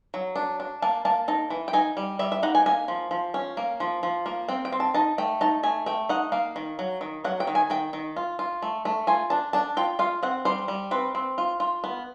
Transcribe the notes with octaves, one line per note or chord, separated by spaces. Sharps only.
F#3
D4
D4
A#3 A5
A#3 A5
D#4 A5
E3
G5
D#4 G#5
G3
G3 E5
E5
D#4 F#5
G#5
A#3 G#5
F3
F3
C#4
A#3
F3
F3
A#3
C4 G5
G5
C4
A5
D#4 A5
A3 G5
D#4 A5
A3 G#5
A3 G5
D#4 F#5
A#3 F5
D#3
F#3
D#3
F#3 F#5
G5
D#3
G#5
D#3 G5
D#3
F4
F4
A3
A3
F4 G#5
D4 A5
D4 A5
F4 G5
F4 F5
C4 F#5
G3 C5
G3
C4 B4
C4
F4
F4
B3